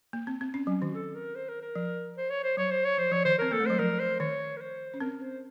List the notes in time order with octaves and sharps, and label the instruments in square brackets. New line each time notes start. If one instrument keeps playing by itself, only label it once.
[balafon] A#3
C4
C4
C#4
[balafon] F#3 [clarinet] C#4
[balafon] D#3 [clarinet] F#4
[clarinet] A4
A#4
C5
A#4
A#4
[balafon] F3
[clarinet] C5
C#5
C5
[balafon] F#3 [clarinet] C#5
[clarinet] C5
C#5
[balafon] F3 [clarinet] C5
[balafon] F3 [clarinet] C#5
[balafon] D#3 [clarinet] C5
[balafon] C4 [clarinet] A#4
[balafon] A#3 [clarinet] A4
[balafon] A3
[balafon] F#3 [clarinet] C5
[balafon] F3 [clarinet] A#4
[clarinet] C5
[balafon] D#3 [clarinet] C#5
[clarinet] A#4
C5
[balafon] C#4
[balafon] C4 [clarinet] A#4
[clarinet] C5